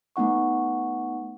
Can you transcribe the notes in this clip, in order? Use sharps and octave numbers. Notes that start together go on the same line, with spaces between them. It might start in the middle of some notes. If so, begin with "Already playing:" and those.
A3 B3 D#4 F#5 C#6